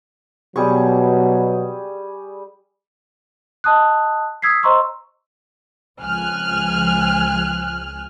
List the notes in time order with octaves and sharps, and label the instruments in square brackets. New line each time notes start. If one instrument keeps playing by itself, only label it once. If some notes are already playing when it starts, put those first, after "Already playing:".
[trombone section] B2 F#3 [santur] G3 G#4 C#6
[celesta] D#5 A5 D#6 F#6
D#6 E6 G#6 B6 C7
C5 D#5 A#5 C6 C#6 E6
[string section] C#2 F3 G#5 F6 F#6